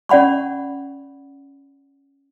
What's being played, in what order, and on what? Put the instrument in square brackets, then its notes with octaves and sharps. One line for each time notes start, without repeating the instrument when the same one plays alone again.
[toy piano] C#4 D5 F#5 B5 C#6